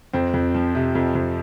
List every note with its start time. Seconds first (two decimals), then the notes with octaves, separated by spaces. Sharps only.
0.13 F2 C4
0.34 F2
0.54 F3
0.75 C3
0.95 F2
1.15 F2